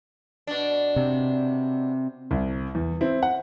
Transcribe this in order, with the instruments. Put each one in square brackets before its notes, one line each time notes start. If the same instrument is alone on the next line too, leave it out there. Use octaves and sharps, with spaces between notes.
[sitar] B2 D4
[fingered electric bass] C3
[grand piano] C2
E2
C4 E4
F#5